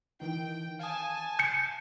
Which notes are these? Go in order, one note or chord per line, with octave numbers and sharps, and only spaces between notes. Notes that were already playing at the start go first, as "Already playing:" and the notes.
D#3 E3 D#4 G5
F5 G#5 A5 D#6
G6 C#7